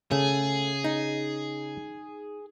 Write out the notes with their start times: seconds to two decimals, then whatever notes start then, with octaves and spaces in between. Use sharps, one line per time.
0.12 C#3 A3 G#4
0.84 D#4